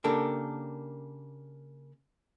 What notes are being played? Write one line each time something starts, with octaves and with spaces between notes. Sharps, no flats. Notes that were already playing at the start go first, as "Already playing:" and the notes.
C#3 A#3 D4 G4 A4 A#4